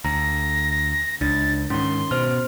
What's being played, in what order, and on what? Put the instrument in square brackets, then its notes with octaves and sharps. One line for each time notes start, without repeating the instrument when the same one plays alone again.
[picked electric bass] D2 [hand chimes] A#5 [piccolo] A#6
[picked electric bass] C#2 [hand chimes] D4 [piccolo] A6
[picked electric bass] G#2 D#3 [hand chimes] C#4 [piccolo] C6
[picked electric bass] B2 [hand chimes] C5 F6